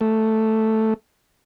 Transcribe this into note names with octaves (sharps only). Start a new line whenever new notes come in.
A3